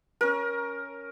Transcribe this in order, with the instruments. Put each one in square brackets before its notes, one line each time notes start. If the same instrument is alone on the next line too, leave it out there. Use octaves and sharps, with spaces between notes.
[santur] C#4 A#4